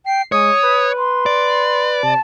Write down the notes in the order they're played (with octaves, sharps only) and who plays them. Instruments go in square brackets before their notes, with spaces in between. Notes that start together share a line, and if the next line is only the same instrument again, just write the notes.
[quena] G5 [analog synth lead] C7
[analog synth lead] G#3 [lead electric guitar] C#5 [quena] D#6
[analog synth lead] B4
[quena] C6
[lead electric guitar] D5
[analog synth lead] C3 [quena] A5